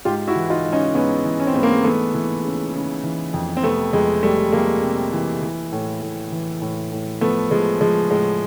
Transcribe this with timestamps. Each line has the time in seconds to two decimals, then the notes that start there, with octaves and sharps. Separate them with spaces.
0.05 G#2 F4 G4
0.27 E4 F#4
0.36 E3
0.50 D#4 F4
0.65 G#2
0.73 C#4 D#4
0.95 G#2 B3 C#4
1.25 E3
1.40 C#4
1.47 C4
1.55 G#2 B3
1.63 A#3 C4
1.84 E3 A3 B3
2.14 E3
2.44 C#3
2.73 C#3
3.03 E3
3.34 F2
3.57 C4
3.63 C3 A3 B3
3.93 F2 G#3
4.23 F2 G3 A3
4.52 F2 G#3 A#3
4.82 C3
5.13 E3
5.42 E3
5.72 A2
6.02 A2
6.32 E3
6.61 A2
6.91 A2
7.21 F3 A3 B3
7.51 F3 G#3
7.81 F3 G#3
8.11 A2 G#3